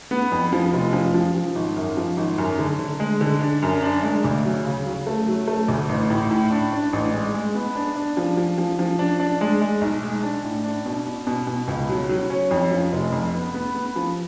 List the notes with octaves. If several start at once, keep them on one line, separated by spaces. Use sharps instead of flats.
B3
F2
F3
F1
F3
F3
F3
G#1
F#2
F3
G#1
F#2
D3
D3
G#3
D3
D4
F#2
D4
G#3
D2
F#3
C#3
F#3
A3
F#3
A3
D2
A1
A2
A2
D4
D4
A1
G#3
G#3
B3
D4
D4
F3
F3
F3
F3
D4
D4
G#3
G#3
B1
G#3
D4
A2
D4
B2
B2
B2
B2
C#2
F#3
F#3
C#4
F2
F3
F1
F2
B3
B3
B3
F3